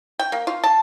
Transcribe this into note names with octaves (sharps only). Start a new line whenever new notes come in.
G5
A#3
F4
A5